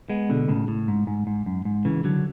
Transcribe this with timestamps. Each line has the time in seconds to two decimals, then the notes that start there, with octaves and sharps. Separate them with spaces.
0.10 G#3 B3
0.29 B2 D3
0.48 A2 C#3
0.68 A2
0.88 G#2
1.07 G#2
1.27 G#2
1.46 F#2
1.65 G#2
1.85 C#3 E3
2.04 D3 F#3